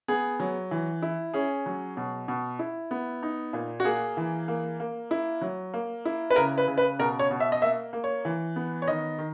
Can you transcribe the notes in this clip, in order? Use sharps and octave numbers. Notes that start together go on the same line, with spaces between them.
B3 G#4
F#3
E3
E4
C#4 G#4
F#3
B2
B2
E4
B3
D#4
A#2
F#4
A#3 G#4
E3
A#3
A#3
E4
F#3
A#3
E4
B4
C#3 A#4
B4
C#3
B4
B2 A#4
C#5
B2
E5
D#5
A#3 E5
A#3
C#5
E3
B3
C#5
D#3 D#5
D#3